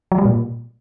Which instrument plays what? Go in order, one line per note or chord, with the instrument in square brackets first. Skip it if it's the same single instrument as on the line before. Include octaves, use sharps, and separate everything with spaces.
[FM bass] F#3
G3
A#2